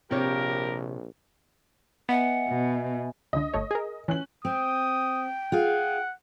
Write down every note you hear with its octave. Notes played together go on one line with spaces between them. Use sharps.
A#1 C3 G4 A#4 C#5 F5
B3 D#5 E5 F#5 G#5
B2
C#2 D3 D#5
G1 A3 C#5
G#4 A#4
E3 C#4 F#6 F#7
C4 G5 D#6
F4 G#4 F5 F#5